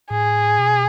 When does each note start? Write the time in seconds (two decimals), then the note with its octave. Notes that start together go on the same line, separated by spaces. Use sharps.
0.11 A2 G#4
0.59 B2